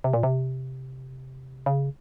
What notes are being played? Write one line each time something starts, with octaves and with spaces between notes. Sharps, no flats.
C3
A#2
C3
C#3